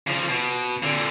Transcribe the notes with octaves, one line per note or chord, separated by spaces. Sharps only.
C#3 F3
B2
A#2 D3